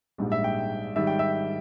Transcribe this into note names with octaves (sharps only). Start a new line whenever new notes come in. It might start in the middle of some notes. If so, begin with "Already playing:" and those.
A#1 G#2 G3
E5
G5
G#2 D#3 G3 E5
G5
E5